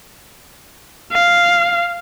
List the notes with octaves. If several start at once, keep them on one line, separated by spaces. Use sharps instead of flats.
F5